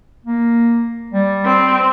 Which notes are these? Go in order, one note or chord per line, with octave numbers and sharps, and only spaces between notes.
A#3
G3
C4